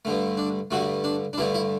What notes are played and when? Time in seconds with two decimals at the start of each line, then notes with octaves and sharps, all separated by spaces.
0.05 G2 D3 A3
0.37 D4
0.71 G2 D3 A3 F#4
1.04 D4
1.33 D4
1.38 G2 D3 A3 E4
1.54 E4